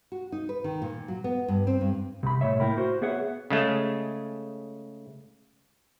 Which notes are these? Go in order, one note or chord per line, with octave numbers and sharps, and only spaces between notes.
F#4
D#4
B4
D#3
A#2
F#3
B3
G2
C4
G2
C2 B5
C2 A2 D#3 C#5 E5
A2 A#3 E4 A#4 G5 B5
F#4 C5
B3 G#4 B4 C#5 E5 F#5
C#3 G#3 A3